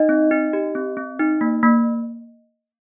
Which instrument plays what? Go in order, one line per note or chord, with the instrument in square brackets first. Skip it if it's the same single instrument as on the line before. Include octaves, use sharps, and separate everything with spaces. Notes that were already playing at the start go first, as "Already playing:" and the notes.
Already playing: [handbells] D#4 D#5
C4
D#4
G4
C4
C4
D#4
A#3
A#3